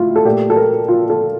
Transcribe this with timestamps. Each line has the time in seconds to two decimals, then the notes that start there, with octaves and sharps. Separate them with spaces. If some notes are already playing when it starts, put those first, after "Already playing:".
Already playing: A2 E4 F4
0.16 A4
0.25 A#2 A3 G4
0.50 A4
0.56 A#4
0.88 F4
1.10 A4